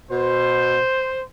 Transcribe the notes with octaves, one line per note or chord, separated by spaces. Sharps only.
B2 C5